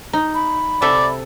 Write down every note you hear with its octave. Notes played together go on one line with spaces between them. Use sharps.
D#4
B5
C3 A4 D5 E5